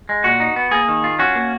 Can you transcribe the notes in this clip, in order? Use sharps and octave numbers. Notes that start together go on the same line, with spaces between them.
G#3
A#2 F#4
D#4
B3
A#3 G#4
D#3
F4
C#4 F#4
A#3